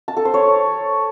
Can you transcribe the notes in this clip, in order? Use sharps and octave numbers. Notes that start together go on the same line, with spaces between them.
A5
A4
C5
C#5